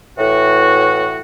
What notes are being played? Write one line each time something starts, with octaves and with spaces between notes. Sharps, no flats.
A2 E3 F#4